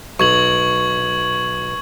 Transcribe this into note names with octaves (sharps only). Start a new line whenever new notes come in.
B1 C#6 G#6 F#7